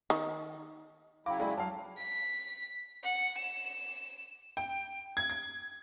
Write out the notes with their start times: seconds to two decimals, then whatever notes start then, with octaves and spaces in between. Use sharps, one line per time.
0.10 D#3
1.26 C#3 F#3 E4 F5 G5 D6
1.40 G#3 G#4 D5
1.57 F#3 F5 A5
1.98 B6
3.04 F#5
3.39 E7
4.57 G5
5.17 G#6
5.30 G#6